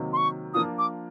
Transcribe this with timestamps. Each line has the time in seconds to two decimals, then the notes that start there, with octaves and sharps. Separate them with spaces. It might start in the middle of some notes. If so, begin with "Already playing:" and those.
Already playing: C3 D#3 F#3 A#3
0.13 C6
0.17 C#6
0.54 F3 A#3 D4 F4 D#6
0.78 D6